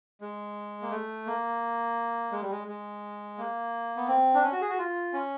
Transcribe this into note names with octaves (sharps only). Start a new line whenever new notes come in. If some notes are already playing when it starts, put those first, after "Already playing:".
G#3
A#3
A3
A#3
G#3
G3
G#3
G#3
A#3
B3
C4
D4
C#4
F#4
G#4
F#4
F4
C#4